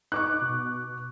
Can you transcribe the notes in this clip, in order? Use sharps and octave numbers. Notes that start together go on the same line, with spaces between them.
D#4 C#6 D6 F#6
B2